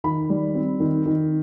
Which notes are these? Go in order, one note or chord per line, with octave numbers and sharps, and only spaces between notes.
D#3 B5
G3
C4
D#3
D#3